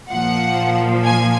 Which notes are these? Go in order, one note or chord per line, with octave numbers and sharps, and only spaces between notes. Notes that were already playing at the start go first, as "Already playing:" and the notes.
A#2 F3 F#5
G#5